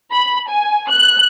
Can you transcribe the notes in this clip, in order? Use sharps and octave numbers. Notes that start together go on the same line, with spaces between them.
B5
G#5
F#6